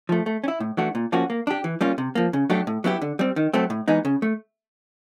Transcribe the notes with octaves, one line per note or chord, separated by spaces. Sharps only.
F3 A3
A3
C#4
E4
A2
E3 A3 D4 F#4
A#2
F3 A#3 C#4 F#4
A#3
D4 G4
E3
G3 A#3 C#4 F4
C3
F3 A#3
C#3
F#3 A3 D4 G4
A2
F#3 B3 E4 G4
D3
G3 C4
D#3
F#3 A3 C4
A2
E3 G#3 B3 D#4
C#3
A3